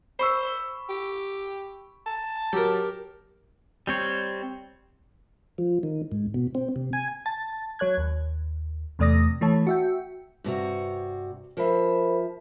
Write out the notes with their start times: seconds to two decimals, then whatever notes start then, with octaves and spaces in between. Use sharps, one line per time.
0.19 C5 B5 C#6 E6
0.89 G4
2.06 A5
2.53 F#3 G4 A#4
3.87 G3 C4 C#5
5.58 F3
5.83 D#3
6.12 G#2
6.34 B2
6.55 C4
6.76 C3
6.93 G#5
7.26 A5 A6
7.79 F#3 C#5 F#6 G#6
7.97 D#2
8.99 E2 C3 A3 D5 D#6 A#6
9.41 E3 A3 C#5 A5
9.67 F#4 E5 G5
10.44 G2 C3 F#4
11.57 F3 A#4 C5 E5 B5